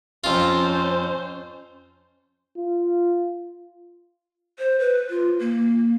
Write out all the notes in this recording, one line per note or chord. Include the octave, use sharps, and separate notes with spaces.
F2 C#4 F4 C5
F4
C5
B4
F4
A#3